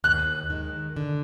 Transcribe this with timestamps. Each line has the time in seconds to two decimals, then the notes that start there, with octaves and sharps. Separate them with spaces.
0.04 D#2 F#6
0.50 D#3 G#3
0.96 D3